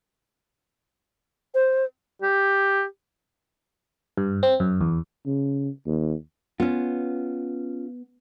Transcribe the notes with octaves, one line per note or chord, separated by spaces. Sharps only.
C5
G4
G2
C4
F#2
E2
C#3
D#2
B3 C#4 F4